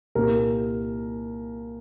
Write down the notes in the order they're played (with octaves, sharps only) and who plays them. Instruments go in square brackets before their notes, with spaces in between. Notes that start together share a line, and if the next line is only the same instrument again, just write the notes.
[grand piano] C2 A#2 A#4